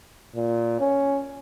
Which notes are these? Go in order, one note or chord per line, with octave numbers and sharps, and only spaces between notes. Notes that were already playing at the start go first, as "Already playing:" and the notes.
A#2
C#4